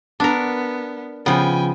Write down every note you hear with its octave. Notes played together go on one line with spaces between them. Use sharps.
B3 D4 A#4
C#3 F3 B3 G5 G#5